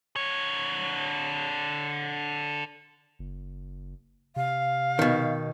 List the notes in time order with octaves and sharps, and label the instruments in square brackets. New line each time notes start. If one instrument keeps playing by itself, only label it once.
[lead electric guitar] D3 C#5
[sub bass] F#1
[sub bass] C3 [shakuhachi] F5
[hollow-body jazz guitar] B2 D#3